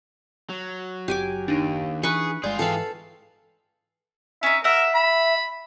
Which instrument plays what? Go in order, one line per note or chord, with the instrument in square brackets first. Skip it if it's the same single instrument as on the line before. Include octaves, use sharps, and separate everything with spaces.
[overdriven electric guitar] F#3
[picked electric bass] F#1 [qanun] G4 G#5 D6
[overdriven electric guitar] D#2 [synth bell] D4 D#4
[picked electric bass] E3 [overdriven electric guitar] G#4 [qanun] B4 B5 C#6
[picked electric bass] G1 G#3 [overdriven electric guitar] F4 G#4 [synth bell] D5 C6 G6
[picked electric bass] G#2 E3 [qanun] A4 F5 [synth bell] B4 G5 G#5
[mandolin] C#4 D#4 [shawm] E5
[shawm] A#4 [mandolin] E5 F#5
[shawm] B5